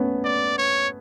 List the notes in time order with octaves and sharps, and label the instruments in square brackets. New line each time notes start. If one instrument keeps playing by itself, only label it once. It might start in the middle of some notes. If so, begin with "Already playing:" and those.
Already playing: [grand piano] A3 B3 C#4
[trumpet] D5
C#5